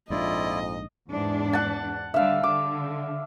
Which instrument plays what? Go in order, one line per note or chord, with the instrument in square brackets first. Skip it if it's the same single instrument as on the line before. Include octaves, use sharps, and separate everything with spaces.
[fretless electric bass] A#1 G#2 D4 [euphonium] F2 [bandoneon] E4 F4 D5 [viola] D#5
[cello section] E2 G#2 D4
[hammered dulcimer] F#5 A5
[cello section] D3 G3 [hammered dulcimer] E5 F5
[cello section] D3 [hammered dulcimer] D6